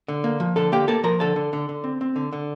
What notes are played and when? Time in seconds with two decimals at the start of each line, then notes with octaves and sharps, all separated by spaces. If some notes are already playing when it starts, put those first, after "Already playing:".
0.08 D3
0.24 A#3
0.40 F3
0.56 D3 A4 A5
0.72 A#3 G4 G5
0.88 A#3 A4 A5
1.04 F3 A#4 A#5
1.20 D3 A4 A5
1.36 D3
1.53 D3
1.69 D3
1.84 C4
2.01 C4
2.16 D3
2.33 D3